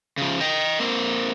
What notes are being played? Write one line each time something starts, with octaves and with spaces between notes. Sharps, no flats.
C#3 F3
D#5 G5
A#3 C4